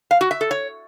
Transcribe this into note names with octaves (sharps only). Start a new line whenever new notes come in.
F5
F#4
E5
A4
C#5